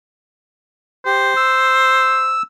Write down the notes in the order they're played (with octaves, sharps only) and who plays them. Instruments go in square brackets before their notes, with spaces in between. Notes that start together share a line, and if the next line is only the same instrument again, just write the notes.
[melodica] G4 [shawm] C5
[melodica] E6